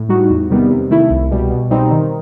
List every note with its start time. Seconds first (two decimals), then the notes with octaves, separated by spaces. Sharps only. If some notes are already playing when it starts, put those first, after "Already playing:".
Already playing: A2
0.09 G3 D#4 F#4
0.30 E2
0.50 C3 D#3 G3 B3
0.71 C3
0.90 D#3 A3 E4
1.10 C2
1.31 B2 G3
1.51 B2
1.71 G3 C4 D#4
1.92 D#3